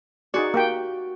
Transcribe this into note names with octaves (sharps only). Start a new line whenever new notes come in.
D#4 F#4 G#4 D5
A#3 G4 G5